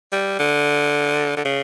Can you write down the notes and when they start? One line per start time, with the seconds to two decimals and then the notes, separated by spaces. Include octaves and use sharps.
0.12 G3
0.39 D3
1.37 D3
1.45 C#3